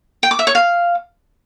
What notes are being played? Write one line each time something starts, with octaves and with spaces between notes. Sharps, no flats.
G5
D6
E5
C#5
F5